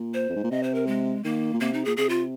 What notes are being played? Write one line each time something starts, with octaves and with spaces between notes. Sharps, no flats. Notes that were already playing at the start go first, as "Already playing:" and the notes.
Already playing: A#2
C5
F2
G#2
A#2
C3 D#5
C5
A#4
G#3
D#3 A#3
A#2
C3 A#3
D#4
A#2 G#4
C3 G#4
F4